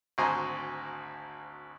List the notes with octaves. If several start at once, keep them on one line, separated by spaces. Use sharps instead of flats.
G#1 D2 C5 G#5 A#5 D#6